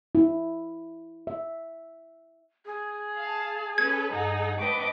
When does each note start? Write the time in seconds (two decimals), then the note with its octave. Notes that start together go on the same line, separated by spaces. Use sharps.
0.15 E4
1.27 E5
2.66 G#4
3.17 F5 A5
3.78 C#4 A4 B4 G#6
4.12 G2 D#4 F#5
4.59 C4 D4 B4 D#5 G5 D6